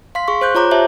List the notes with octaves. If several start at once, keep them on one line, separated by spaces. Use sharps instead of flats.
F5 C6 B6
G#4 C6 C#6
C5 F#6 G6
F4 C#5 A#5 D6 G6
G4 C5 C#5 E5 A5